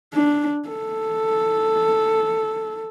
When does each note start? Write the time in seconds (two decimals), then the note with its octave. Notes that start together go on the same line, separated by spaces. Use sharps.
0.14 D4
0.69 A4